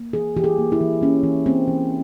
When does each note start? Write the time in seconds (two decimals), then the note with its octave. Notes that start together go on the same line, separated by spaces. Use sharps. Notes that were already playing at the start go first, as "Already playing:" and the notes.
Already playing: A#3
0.13 E3 G#4
0.37 E3 G4
0.44 G#4
0.58 A#3
0.72 E4
0.81 E3
1.01 A#3 C#4
1.23 E3
1.46 A#3 C4
1.67 E3